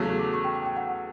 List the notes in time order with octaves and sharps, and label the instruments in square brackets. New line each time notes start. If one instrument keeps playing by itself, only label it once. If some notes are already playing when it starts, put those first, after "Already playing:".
Already playing: [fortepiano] E2 C#3 F#3 A3
[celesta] D6
C#6
G5
G5
G5
F#5